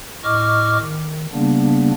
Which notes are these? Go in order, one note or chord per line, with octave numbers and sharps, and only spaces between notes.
A2 D#5 C#6 D6 F6
D#3
C#3 G3 A#3 B3 D4